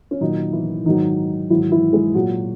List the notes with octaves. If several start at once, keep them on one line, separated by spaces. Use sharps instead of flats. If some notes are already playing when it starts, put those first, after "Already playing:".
C#4
A#2 D#3 F#3 D#4
E3 E4
G#2 D#3 F#3 D#4
G#2 D#3 E3 F#3 E4
E3 E4
G#3 G#4
A#2 F#3 F#4